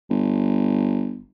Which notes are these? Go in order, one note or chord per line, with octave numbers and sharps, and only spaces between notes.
G1